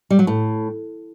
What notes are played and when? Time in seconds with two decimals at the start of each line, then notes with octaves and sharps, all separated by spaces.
0.10 G3
0.19 F#3
0.27 A2